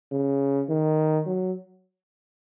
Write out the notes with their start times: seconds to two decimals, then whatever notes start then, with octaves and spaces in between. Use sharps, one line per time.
0.12 C#3
0.69 D#3
1.26 F#3